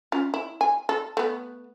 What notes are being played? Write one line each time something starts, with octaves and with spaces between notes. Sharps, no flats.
C#4 F4
E4
G#5
A4
A3 B3